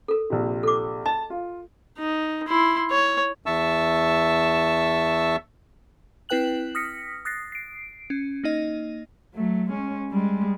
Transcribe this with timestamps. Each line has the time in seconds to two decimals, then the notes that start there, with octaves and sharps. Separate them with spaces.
0.08 A4 A#4
0.30 A#1 C3
0.63 A4 D6
1.06 D#5 A5
1.30 F4
1.98 D#4
2.48 E4 C6
2.91 C#5
3.46 E2 E5 A5 C#6 E6
6.29 C4 E4 B4 G5 F#6 F#7
6.75 D#6 F6 A#6 B6 C#7
7.25 D#6 F#6 A6 A#6 C7
7.52 C7 D7
8.10 C#4
8.44 A#3 D#4 D#5
9.35 F#3 A3
9.70 G#3 C#4
10.11 G3 G#3